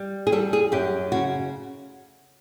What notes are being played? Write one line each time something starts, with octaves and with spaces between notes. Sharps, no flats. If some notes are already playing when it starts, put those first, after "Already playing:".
Already playing: G3
G#4
G3 A4
G#4
F#2 G4
C#3 F#4